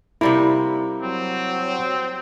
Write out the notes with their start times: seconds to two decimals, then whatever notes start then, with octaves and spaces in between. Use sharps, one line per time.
0.21 C3 G3 A#3 E4
1.03 F#3 C4